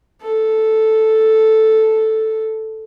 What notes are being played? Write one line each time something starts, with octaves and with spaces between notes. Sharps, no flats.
A4